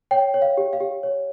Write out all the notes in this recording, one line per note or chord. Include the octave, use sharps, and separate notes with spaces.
C#5 G5
C#5
F5
G4
F5
G4
C#5